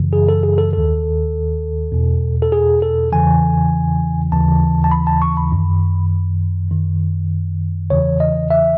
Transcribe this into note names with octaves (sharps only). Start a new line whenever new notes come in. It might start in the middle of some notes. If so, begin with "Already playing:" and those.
Already playing: F#2 C#3 E3
G#4
A4
G#4
A4
D#2 D#3 A4
E2 B2
A4
G#4
A4
E2 C#3 E3 G#5
D#2 C#3 E3 A5
A5
B5
A5
C#6
B5
F#2 D#3
F#2 D#3
E2 C#3 E3 C#5
D#5
E5